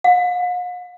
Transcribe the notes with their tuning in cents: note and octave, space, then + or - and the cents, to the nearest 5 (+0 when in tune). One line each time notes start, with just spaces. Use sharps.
F5 +45